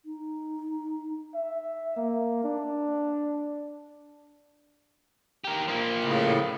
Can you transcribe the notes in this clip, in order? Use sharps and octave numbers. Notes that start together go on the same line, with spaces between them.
D#4
E5
A#3
D4
G4 A#4
F3 A#3
A2 C#3